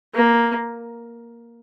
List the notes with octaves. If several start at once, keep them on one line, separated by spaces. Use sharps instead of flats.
A#3